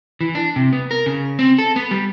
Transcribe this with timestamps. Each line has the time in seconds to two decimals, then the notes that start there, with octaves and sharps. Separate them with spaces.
0.21 E3
0.35 D4
0.56 C3
0.73 B3
0.91 A#4
1.06 C#3
1.39 C4
1.58 A4
1.76 B3
1.91 G3